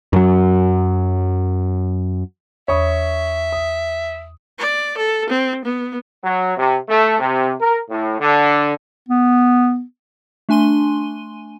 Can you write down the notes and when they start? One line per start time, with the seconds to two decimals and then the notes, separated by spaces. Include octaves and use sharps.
0.13 F#2 F#3
2.68 E2 C#5 E5 B5 C#6 D#6
3.52 D#6
4.59 D5
4.97 A4
5.29 C4
5.65 B3
6.23 F#3
6.57 C3
6.88 A3
7.19 C3
7.60 A#4
7.89 A2
8.19 D3
9.08 B3
10.49 A3 D4 G#5 C6 D#7 G7